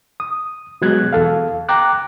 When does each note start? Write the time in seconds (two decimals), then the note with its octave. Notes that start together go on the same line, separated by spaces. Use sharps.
0.20 D#6
0.81 B2 F#3 G#3 F#6 G#6
1.13 E2 A4 F5
1.69 G5 A#5 D6 F#6